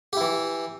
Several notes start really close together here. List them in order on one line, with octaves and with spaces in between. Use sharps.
G4 E4 E3